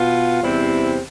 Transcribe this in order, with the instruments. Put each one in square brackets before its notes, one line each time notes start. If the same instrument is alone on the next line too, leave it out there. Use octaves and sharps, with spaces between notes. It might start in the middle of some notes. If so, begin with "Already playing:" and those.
Already playing: [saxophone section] B2 B3 F4
E2 C3 G3 C4 E4